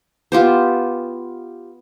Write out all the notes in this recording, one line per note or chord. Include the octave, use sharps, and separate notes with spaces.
B3 F4 G4 C5